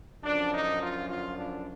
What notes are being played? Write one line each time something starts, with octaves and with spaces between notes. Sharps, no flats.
F#2 D3 F3 D4
D#4
F4
F4
D4